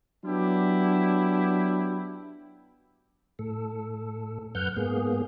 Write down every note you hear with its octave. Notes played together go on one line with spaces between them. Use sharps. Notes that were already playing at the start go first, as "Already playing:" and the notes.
F#3 B3 D4 E4 G4
A2 A4
F#2 B4 F#5 F6 G6
G#2 A#3 B3 G#4